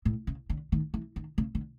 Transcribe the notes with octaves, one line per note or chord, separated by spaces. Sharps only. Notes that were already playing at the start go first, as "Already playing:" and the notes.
A2
C#3
D3
D#3
E3
D#3
C#3
D3